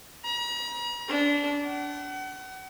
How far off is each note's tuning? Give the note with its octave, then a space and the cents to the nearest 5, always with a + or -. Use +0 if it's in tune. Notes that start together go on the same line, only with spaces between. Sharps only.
A#5 +45
D4 -25
F#5 +40